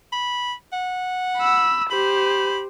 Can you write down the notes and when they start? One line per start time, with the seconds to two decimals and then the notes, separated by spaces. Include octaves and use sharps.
0.12 B5
0.73 F#5
1.38 B5 E6
1.90 G4 C5 B5